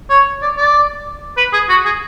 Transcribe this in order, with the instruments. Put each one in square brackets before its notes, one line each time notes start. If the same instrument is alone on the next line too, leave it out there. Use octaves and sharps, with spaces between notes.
[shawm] C#5
D5
D5
B4
G#4
F#4
G#4